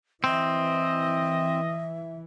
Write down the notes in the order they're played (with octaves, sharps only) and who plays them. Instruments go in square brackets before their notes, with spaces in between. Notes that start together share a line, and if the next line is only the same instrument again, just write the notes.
[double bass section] E3 [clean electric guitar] C4 [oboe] D#5 [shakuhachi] E5